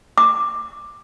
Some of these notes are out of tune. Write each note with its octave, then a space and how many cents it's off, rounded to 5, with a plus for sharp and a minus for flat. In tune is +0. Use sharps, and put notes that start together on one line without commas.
D6 +10